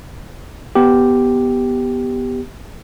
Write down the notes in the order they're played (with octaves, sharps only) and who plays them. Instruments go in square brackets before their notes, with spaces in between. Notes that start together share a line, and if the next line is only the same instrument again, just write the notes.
[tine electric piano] B3 G4